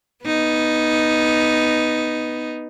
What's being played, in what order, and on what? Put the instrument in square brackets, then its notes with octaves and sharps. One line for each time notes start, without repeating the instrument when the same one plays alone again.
[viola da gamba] B3 D#4